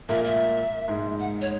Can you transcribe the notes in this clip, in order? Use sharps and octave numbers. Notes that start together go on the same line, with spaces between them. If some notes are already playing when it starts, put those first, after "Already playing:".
A#2 A#3 E5
E5
G#2 G#3
F#5
C#5